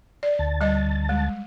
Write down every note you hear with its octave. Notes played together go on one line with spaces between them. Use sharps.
D5
D2 A5
G3 D#5
G#3